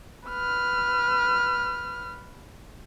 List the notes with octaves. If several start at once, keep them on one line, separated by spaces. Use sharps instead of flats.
B4 F6